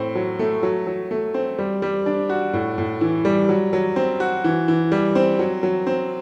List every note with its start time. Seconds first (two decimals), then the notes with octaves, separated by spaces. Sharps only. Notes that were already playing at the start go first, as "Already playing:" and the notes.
Already playing: A2 C4
0.15 F#3
0.39 A3
0.63 F#3
0.87 F#3
1.11 A3
1.34 C4
1.59 G3
1.82 G3
2.06 D4
2.30 F#4
2.53 A2
2.78 A2
3.01 E3
3.25 G3
3.49 F#3
3.73 F#3
3.96 C4
4.20 F#4
4.44 E3
4.68 E3
4.92 G3
5.15 C4
5.39 F#3
5.63 F#3
5.87 C4